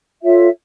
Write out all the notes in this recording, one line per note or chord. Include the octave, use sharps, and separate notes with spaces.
F4 A4 C#5 E5